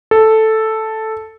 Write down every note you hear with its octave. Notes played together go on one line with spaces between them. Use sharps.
A4